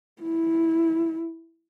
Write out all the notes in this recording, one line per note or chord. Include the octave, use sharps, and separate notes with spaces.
E4